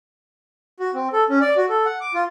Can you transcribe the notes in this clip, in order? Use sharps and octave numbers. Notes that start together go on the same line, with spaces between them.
F#4
C4
A4
C#4
D5
F#4
A4
F#5
D6
F4